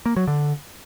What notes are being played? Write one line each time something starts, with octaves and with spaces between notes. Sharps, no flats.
A#3
F#3
D3